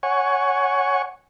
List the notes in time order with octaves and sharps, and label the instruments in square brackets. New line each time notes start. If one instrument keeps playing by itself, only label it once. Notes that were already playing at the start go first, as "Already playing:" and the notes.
[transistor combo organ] C#5 F#5 G#5 C#6